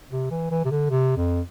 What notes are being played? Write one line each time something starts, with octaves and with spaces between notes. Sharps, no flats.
C3
E3
E3
C3
D3
C3
F2